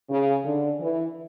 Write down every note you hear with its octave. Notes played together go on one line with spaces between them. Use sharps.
C#3
D3
E3